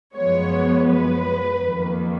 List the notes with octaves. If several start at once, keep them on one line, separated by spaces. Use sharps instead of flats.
F#2 F3 G#3 B3 C#5
B4
F2 D#3 A#3